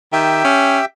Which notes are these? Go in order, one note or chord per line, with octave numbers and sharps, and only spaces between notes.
D#3 G4 E5 G5
C#4